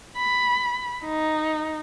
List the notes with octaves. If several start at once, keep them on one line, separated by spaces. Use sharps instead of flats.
B5
D#4